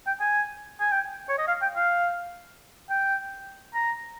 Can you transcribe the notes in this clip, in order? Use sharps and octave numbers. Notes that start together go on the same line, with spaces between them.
G5
G#5
G#5
G5
C#5
D#5
F5
G5
F5
G5
A#5